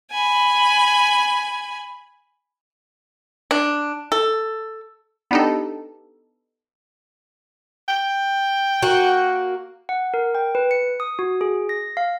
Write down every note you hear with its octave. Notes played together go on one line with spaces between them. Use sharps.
G#5 B5
D4
A4
B3 D4 D#4 G4 A4
G5
A#3 F#4
F#5
A#4
G5
B4
C#7
D#6
F#4
G#4
A#6
F5